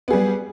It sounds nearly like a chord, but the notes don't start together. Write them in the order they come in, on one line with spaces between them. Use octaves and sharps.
B3 G#4 G3